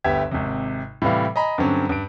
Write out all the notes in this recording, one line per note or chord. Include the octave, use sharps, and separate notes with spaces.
G1 D2 B3 G4 E5 G#6
G#1 C3
A2 C3 E3 G3 F5
D#5 G#5 A#5 B5
G2 D3 F#3 C4 C#4
G2 D7